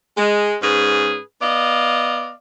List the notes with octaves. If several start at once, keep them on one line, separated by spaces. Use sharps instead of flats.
G#3
G#2 C#4 G#4 B4
B3 D5 D#5 F5